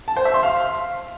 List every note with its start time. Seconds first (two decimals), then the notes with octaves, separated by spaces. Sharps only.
0.08 A5
0.17 C5
0.25 E5
0.34 C6
0.43 F5